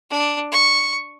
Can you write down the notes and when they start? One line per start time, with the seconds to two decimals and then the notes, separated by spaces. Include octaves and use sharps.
0.10 D4
0.52 C#6